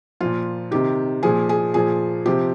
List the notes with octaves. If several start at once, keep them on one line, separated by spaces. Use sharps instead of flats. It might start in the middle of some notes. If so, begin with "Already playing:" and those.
A#2 F3 F4
C3 D#3 G4
A#2 F3 G#4
G#4
A#2 F3 G#4
C3 F3 G4